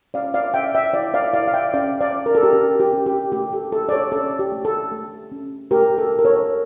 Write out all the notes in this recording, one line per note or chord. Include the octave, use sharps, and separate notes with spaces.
C#4 D5 F5
D5 F5
C#4 E5 G5
E5 G5
E4 D5 F5
D5 F5
E4 D5 F5
F5
E5 G5
C#4 D5 F5
D5 F5
C#4
A#4
A4
G4 A#4
C#4 G4
G4
C#4
G4
A3 G4
A4
A3 A4
D5
A4 C#5
C#4 A4
G4
A3
A4
A3
C#4
A3 G4 A#4
A4
G4
A#4
A4 C#5